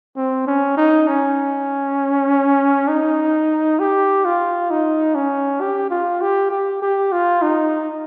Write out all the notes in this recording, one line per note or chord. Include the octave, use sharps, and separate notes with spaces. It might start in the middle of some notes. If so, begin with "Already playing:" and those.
C4
C#4
D#4
C#4
D#4
G4
F4
D#4
C#4
G4
F4
G4
G4
G4
F4
D#4